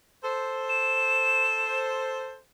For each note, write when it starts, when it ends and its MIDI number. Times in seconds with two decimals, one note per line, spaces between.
0.23 2.37 69
0.23 2.37 72
0.69 1.80 100